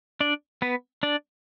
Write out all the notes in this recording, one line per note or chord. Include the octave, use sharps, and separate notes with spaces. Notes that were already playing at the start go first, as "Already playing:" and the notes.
D4 D5
B3 B4
D4 D5